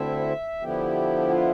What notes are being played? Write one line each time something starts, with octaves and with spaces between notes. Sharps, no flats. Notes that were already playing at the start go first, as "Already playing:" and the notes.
Already playing: D2 D3 A3 C4 E4 E5
D3 F3 B3 E4 G4
F4